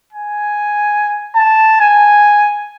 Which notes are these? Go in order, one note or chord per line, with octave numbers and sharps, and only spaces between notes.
G#5
A5
G#5